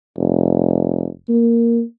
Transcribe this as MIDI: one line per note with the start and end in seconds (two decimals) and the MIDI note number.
0.18 1.08 29
1.29 1.82 58